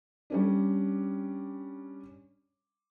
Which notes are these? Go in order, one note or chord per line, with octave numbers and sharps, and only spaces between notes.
G3 C#4 D4